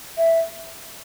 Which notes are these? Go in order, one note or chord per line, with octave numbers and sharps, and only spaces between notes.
E5